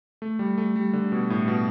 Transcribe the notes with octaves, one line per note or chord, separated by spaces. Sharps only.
A3
G3
A3
G3
D3
B2
A2
B2